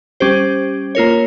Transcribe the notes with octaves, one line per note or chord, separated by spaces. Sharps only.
G3 C#4 G4 C5
A#3 F4 A#4 C#5